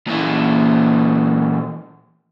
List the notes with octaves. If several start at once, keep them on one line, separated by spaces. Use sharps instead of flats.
A#2 E3